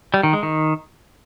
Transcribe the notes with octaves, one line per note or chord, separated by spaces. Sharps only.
G3
D#3
G#3
D#3